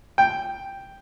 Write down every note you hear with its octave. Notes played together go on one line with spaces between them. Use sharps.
G5